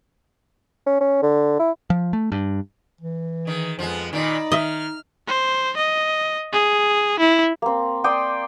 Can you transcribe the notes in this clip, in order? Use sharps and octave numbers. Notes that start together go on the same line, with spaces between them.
C#4
C#4
D3
E4
F3
A3
G2
E3
D#3 G#4
F2 F3 G#3 B3
A#2 D#3 D#4 D5 D#5 B5
D#3 D#5 E5 F6
C5
D#5
G#4
E4
A#3 C4
D5 G5 C6 D#6